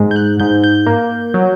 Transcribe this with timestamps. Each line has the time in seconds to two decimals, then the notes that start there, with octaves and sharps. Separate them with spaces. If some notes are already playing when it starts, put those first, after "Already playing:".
Already playing: G#2
0.11 G6
0.16 F#6
0.40 G#2 G6
0.64 G6
0.86 A#3
1.34 F#3